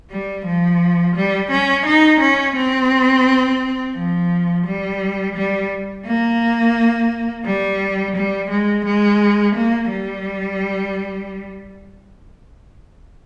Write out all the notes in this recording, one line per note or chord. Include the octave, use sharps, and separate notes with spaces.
G3
F3
G3
C#4
D#4
C#4
C4
F3
G3
G3
A#3
G3
G3
G#3
G#3
A#3
G3